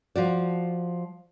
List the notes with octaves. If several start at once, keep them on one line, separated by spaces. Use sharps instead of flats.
F3 F#4 D5